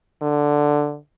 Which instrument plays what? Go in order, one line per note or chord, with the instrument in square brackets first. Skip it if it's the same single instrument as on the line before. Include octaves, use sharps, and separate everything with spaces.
[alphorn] D3